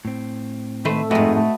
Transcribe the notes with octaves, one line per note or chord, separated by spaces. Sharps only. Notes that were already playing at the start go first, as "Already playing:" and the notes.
A2 C4
D#3 A3 B4 C5
F2 G#2 A3 F#4 B4 D#5
A3